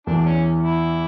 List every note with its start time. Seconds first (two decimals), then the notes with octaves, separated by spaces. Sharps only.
0.07 E2 E3 D4
0.26 C#4
0.63 E4